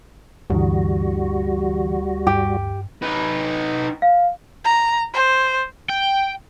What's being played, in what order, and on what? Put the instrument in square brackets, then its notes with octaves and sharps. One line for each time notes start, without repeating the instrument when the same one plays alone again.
[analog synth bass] D2 [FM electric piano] G2 D3 E3 [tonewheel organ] G3 F#4
[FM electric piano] G2 [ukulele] G4
[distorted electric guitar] D#4 B4
[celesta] F5
[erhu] A#5
C5
[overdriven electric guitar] G5